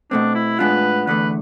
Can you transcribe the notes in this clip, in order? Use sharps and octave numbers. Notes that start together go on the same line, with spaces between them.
B2 A3 C4 D4
E4
A2 G#3 B3 D4 F4 B4
E2 D3 A3 B4